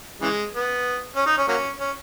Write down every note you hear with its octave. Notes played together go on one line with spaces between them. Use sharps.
C#3 E3 G#3
B3
C#4
D#4
C#4
F#3 A#3 C#4
C#4